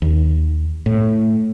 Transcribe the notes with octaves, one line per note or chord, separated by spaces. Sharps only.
D#2
A2